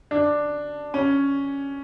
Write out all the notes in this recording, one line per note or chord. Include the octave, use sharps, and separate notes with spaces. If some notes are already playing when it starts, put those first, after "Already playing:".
D4
C#4